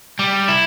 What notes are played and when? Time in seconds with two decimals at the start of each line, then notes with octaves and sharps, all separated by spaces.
0.19 G3
0.48 E4